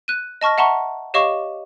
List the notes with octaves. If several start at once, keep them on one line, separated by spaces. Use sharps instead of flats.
F#6 D#7
D#5 A5 C#6 F6 A#6
E5 F#5 A5 A#5 C6 C#6
G4 C#5 D#5 F5 C#6 D6